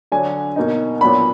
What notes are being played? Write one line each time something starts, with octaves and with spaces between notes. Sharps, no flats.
D3 F#3 D4 G#5
B2 A#3 D#4
A#2 F#3 B3 D4 B5